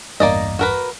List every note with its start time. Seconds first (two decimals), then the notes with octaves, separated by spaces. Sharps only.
0.20 A1 E2 G2 A#3 D5 D#5
0.59 F#4 A#4 B4